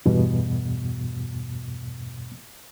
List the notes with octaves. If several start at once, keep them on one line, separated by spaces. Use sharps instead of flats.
E2 G2 B2